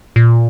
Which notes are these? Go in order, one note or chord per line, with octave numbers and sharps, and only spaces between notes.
A#2